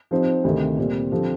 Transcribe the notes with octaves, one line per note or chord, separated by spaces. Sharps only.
F3 C4 D#4 G4 C5
D2 C3 D#3
A#2 G3 C4
D3 F3 C4 G4